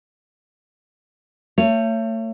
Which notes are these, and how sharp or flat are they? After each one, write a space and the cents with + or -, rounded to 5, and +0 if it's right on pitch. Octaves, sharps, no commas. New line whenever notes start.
A3 +35 C#5 +0